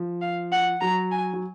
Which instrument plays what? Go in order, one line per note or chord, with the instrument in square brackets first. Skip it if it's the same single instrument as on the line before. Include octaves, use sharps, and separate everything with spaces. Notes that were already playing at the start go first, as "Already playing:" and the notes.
Already playing: [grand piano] F3
[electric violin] F5
F#5
[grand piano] F#3 [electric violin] A#5
[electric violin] G#5
[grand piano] F#3